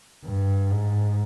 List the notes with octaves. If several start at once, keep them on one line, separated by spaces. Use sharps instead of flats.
G2
G#2